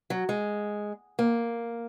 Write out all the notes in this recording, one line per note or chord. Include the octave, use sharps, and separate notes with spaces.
F#3
G#3
A#3